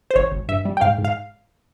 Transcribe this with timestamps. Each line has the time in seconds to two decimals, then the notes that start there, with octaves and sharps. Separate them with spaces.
0.11 C5
0.16 G#1 C#5
0.32 G#1
0.49 G2 E5
0.65 G3
0.77 G5
0.81 G#2 F5
0.98 G#2
1.05 F5